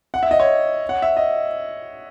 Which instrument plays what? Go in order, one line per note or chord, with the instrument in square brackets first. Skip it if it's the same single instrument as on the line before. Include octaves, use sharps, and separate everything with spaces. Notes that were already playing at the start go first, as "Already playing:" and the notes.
[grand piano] F#5
E5
D#5
C#5
F#5
E5
D#5